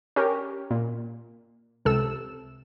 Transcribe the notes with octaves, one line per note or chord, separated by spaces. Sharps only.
C#4 G4 A#4
A#2
C#2 C3 A4 E6 E7